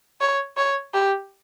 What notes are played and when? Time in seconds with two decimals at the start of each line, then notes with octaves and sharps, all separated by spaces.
0.21 C#5
0.57 C#5
0.94 G4